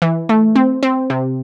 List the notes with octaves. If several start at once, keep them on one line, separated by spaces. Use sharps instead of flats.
E3
A3
C4
C4
C3